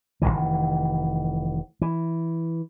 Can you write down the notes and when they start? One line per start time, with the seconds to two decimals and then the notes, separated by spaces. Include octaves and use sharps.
0.22 F1 D2 D#3 E3
1.82 E3